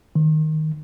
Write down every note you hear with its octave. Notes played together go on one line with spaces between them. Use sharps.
D#3